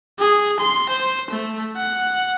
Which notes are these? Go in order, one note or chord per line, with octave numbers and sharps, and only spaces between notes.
G#4
C6
C5
A3
F#5